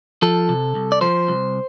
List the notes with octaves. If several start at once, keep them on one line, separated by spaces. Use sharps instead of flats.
F3 A4
C3
C2
D5
F3 C5
C2